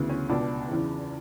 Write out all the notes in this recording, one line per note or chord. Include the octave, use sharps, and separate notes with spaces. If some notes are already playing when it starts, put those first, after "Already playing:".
Already playing: D2 C#3 E3 B3
C#4
C#2 B2 D4
E2 C#3 E3